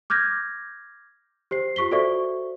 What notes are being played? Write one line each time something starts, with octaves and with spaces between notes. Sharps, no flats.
D6 F6 G6 G#6 A#6
G4 C5 C7
F4 G4 C#6 B6 G7
F#4 A4 C5 D5 E5 C#6